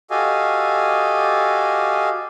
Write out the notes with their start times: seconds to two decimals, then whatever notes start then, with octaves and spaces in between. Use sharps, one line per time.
0.11 F#4 G4 A4 D#5 F5 G#5